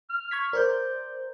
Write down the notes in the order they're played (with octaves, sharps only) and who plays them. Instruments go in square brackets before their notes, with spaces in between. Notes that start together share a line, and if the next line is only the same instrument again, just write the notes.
[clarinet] F6
[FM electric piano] C#6 G#6 B6
[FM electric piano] A#4 C5 G6 [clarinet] D5